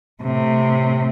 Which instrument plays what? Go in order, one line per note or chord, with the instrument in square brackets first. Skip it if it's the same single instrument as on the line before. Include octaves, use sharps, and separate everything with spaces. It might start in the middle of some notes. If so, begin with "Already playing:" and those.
[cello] A2 C3